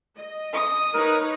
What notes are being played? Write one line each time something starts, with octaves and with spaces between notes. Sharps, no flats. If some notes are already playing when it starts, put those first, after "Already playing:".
D#5
D#6
D#4 A#4 B4 C#5